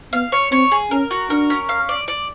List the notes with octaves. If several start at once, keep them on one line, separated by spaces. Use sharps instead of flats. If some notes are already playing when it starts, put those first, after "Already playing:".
B3 F5
C#5
C4 C#5
G#4
C#4 A#4
F#4
D4 A#4
C#4
F5
D5
D5